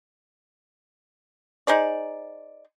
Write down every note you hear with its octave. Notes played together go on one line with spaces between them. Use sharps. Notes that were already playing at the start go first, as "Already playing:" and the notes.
D#4 G#4 C5 D5